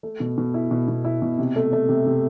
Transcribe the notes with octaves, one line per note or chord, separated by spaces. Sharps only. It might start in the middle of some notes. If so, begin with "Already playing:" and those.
A3
B2
B2
E4
B2
B2
E4
B2
C3
A3
A3
C3
C3